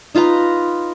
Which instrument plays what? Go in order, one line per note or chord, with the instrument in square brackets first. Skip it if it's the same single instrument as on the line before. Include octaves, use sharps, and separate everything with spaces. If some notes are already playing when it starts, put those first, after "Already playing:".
[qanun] D#4 F4 B4 A#5